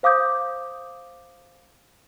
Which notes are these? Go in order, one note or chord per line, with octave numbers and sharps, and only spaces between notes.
C5 F5 D6 D#6 G6